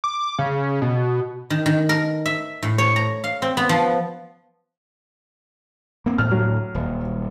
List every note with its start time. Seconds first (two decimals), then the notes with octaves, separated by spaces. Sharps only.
0.04 D6
0.39 C#3
0.82 B2
1.50 D#3
1.66 D#3
1.89 A#4
2.26 E5
2.63 A2
2.78 C#5
2.96 A#5
3.24 F5
3.42 C4
3.57 B3
3.69 F3
6.06 A#3 C4
6.18 D2 A2 F6
6.31 F#3
6.75 D#1